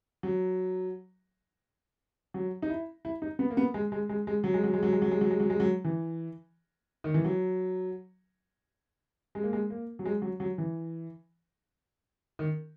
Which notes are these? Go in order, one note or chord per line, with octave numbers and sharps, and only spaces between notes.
F#3
F#3
D#4
E4
E4
D#4
B3
A#3
B3
G#3
G#3
G#3
G#3
F#3
G#3
F#3
G#3
F#3
G#3
F#3
G#3
F#3
G#3
F#3
G#3
F#3
E3
D#3
E3
F#3
G#3
A#3
G#3
A#3
F#3
G#3
F#3
F#3
E3
D#3